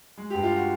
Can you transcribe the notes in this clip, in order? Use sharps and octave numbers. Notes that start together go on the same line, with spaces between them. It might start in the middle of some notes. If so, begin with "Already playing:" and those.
G#3
G2 G4
F4
F#4